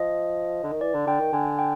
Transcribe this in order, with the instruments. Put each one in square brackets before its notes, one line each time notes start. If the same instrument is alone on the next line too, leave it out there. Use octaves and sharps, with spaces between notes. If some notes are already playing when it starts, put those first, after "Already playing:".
Already playing: [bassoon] F3 [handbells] D#5
[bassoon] D3
D#3
[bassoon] E3 [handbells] D5
[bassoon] D3
[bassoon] D3 [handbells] G5
[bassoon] D#3
[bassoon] D3 [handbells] G#5
[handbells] G5